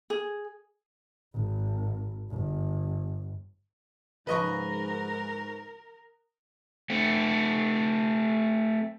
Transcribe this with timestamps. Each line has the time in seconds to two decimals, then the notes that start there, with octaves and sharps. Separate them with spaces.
0.10 G#4
1.34 G#1
2.31 G1
4.27 G#2 C#3 F3 A#4 B4 D#5 C#6
6.90 A3 C4